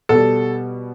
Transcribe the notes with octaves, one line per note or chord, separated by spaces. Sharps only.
B2 G3 A4